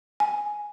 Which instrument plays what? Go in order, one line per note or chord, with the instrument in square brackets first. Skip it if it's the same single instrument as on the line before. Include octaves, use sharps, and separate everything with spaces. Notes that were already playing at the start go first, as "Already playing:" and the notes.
[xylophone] G#5